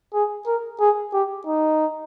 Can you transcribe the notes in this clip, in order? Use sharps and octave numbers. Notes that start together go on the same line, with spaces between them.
G#4
A#4
G#4
G4
D#4